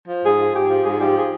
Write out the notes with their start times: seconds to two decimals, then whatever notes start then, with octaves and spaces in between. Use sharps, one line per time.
0.08 F3
0.23 G#2 G#4
0.39 F3
0.55 G#2 G4
0.69 F3
0.85 G#2 G#4
1.00 F3 G4
1.16 G#4